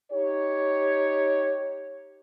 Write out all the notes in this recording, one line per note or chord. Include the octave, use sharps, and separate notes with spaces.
D#4 G4 C#5